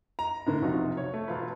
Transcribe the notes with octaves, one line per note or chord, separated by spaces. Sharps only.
A#5
A2 D3 A#3
F1 B1 C3 D#4 F4 F#4
C#5
A3
E1 F4 B4